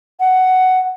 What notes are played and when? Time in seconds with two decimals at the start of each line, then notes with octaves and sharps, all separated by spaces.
0.20 F#5